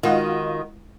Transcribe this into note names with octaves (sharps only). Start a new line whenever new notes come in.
D#3 G#3 F4 F#4 D#5 F5 F#5